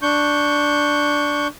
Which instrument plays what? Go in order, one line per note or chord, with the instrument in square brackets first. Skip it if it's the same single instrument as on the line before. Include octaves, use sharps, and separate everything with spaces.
[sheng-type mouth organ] D4 C#6 G6